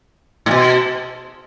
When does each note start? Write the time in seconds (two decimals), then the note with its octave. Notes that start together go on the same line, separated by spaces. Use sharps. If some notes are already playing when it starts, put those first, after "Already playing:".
0.46 A2
0.51 B2